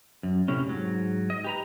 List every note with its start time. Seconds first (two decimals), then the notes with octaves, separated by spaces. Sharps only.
0.23 F#2
0.48 A2 C3 C#4
0.67 G#2 F#3
1.30 D#5
1.44 G4 B4 A#5